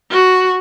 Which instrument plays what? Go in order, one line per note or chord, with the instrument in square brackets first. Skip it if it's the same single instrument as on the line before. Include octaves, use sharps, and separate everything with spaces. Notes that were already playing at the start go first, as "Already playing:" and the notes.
[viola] F#4